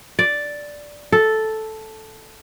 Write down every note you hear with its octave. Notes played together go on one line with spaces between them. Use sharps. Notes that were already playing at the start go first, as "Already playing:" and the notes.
D5
A4